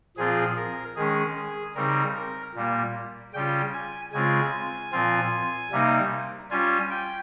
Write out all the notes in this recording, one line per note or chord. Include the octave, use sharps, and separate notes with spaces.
A#2 F3 C4 F4 G#4
A#4
D#3 G#3 C#4 G#4
G#4
C#3 G3 C4 D#4 A#4
A#4
A#2 G3 A#3
C#3 G3 C#4 F4 G5
G#5
C#3 G#3 C4 F4 G#5
A#2 F3 C4 F4
C3 G3 A#3 D#4
G3 C#4 F4 G#5
G5